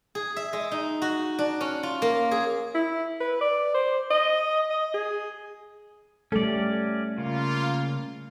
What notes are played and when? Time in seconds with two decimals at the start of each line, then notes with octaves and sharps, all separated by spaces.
0.15 G#4
0.36 E5
0.53 G#3
0.72 D#4
1.02 F#4
1.39 D4
1.61 C#4
1.83 F4
2.02 A#3
2.31 G#4
2.75 E4
3.20 B4
3.41 D5
3.74 C5
4.11 D#5
4.70 D#5
4.94 G#4
6.32 G3 A3 C#4 A4 D5
7.18 C#3 A#3 F4